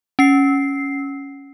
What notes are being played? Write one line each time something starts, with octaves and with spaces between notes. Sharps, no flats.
C#4 C7